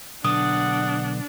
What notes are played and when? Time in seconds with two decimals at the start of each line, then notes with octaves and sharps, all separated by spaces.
0.25 B1 D3 B3 D4 F#5 D#6